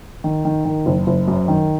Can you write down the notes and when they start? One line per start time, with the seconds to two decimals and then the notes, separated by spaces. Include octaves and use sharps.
0.24 D#3
0.45 D#3
0.65 D#3
0.86 F#1
1.07 F#1
1.28 F#2
1.48 D#3